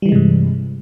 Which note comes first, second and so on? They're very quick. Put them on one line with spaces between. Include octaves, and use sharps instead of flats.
G3 E3 G#3 C3 G2